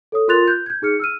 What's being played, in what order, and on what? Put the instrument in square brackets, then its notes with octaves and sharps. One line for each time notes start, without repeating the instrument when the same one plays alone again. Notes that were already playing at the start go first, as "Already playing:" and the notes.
[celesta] A4 C#5 D#6
F4 A#4 C6 F#6 A6 F7
F#6 G6
G6 G#6
D#4 G#4 F6 C#7
E6 F6 D#7